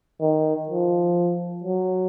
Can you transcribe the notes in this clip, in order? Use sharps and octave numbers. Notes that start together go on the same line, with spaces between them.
D#3
F3
F#3